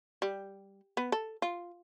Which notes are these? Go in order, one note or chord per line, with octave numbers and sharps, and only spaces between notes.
G3
B3
A4
F4